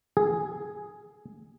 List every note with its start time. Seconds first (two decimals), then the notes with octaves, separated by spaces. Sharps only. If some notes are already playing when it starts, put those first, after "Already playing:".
0.17 G#4